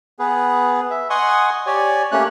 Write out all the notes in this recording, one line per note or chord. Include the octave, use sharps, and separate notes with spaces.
B3 G#4 B4
E5
D#5 F#5 G#5 C6 C#6 D#6
G4 C#5 D5 G#5
A3 A#3 C#4 G4 C#5 F#6